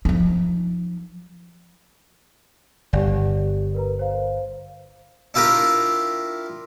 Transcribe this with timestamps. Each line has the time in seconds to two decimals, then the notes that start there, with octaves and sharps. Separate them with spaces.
0.05 F3 D#4
2.93 G1 G4 D5
3.74 A#4 B4 A#5
3.99 C5 F5
5.34 D4 E4 F4 G4 A#4